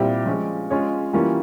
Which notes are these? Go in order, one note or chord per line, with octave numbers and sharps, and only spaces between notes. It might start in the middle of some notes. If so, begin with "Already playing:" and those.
Already playing: A#2 G3 C4 E4 G4
F3 G#3 C#4
G#3 C#4 F4 G#4 C#5
E3 G3 A#3 C#4 F4